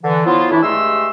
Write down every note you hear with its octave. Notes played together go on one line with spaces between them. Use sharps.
D3 E3
F3 F#3 B3 E4 F4
F#2 A2 E3 D4 E4
G2 G#3 A3 G4 C6 E6